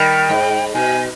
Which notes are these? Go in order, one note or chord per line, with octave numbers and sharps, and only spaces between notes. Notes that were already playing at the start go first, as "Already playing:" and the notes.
Already playing: D#3 G3 G5
G#2
B2 G#5